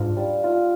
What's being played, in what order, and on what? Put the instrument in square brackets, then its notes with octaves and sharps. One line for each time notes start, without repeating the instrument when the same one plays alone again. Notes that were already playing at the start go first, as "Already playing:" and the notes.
Already playing: [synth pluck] G#2 [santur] D4 F4
[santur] G3
F4